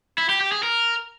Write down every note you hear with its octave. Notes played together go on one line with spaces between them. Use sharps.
E4
G4
G4
G#4
A#4